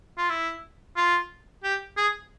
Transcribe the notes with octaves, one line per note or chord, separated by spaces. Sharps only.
F4
E4
F4
G4
G#4